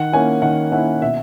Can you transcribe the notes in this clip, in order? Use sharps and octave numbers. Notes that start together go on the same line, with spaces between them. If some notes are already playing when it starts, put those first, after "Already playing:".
Already playing: D#3 F#5
A#3 C#4 E4 G#5
D#3 F#5
A#3 C#4 E4 F#5
B2 E5